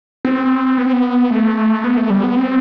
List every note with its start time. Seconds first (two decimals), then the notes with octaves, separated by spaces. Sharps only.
0.25 C4
0.78 B3
0.86 C4
0.93 B3
1.30 A3
1.84 B3
1.97 A3
2.10 G3
2.24 B3
2.37 C4